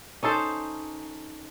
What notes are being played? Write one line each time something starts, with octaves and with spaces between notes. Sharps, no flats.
C#4 D#4 A4 C5